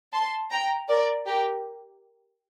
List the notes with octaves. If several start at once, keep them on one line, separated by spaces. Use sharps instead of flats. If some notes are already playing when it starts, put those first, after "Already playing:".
A5 C6
G5 A#5
A#4 D5
G4 A#4